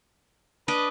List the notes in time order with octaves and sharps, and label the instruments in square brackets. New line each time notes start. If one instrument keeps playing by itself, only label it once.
[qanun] D4 D#5 D6 [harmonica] B4